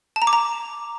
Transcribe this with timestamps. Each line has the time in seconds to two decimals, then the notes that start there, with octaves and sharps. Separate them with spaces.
0.16 A5
0.22 A#5
0.27 D6
0.33 A#5